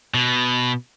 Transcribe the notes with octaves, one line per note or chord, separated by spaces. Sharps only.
B2